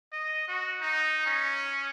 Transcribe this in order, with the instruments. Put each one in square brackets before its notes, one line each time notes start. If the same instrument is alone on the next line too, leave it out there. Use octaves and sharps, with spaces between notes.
[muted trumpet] D#5
F#4
D#4
C#4